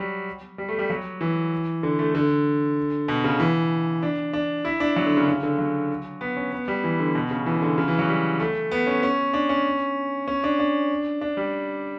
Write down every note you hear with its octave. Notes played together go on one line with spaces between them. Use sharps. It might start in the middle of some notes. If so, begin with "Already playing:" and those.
Already playing: F#3 G3
G3
A3
G3
F#3
E3
D3
A3
D3
B2
C#3
E3
D4
D4
E4
D4
F#3
D3
C#3
C#3
D3
F#3
B3
C#4
B3
G3
E3
D3
B2
C#3
E3
C#3
D3
C#3
E3
F#3
G3
A3
B3
C#4
C#4
D4
C#4
C#4
D4
D4
D4
G3